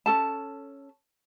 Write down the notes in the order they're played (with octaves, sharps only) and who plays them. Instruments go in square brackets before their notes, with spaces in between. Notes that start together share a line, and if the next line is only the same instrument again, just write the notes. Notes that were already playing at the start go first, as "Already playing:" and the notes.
[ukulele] C#4 A4 A5